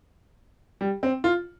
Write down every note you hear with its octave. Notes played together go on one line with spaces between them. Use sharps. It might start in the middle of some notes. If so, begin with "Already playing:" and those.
G3
C4
F4